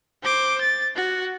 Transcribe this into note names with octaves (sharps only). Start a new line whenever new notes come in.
C5 D6
A6
F#4